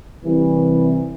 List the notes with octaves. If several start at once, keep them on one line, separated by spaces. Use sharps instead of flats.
C2 E3